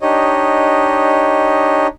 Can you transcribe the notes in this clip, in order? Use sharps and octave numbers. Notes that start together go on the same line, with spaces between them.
D4 D#4 G4 C#5 D#5